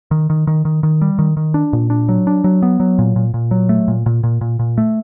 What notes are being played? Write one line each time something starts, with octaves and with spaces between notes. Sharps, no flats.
D#3
D#3
D#3
D#3
D#3
G3
D#3
D#3
D4
A#2
D4
F#3
D4
F#3
B3
F#3
A#2
A#2
A#2
F#3
A3
A#2
A#2
A#2
A#2
A#2
A3